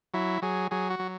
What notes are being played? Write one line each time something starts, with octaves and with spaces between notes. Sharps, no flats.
F#3 E4
F#3 G#4
F#3 G#4
F#4
F#3